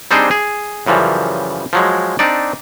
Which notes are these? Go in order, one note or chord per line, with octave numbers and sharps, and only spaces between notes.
G3 C4 D4 D#4 G#4 C5
G#4
F#2 C#3 E3 F3 G3
F3 F#3 G#3
C4 D4 D#4 D5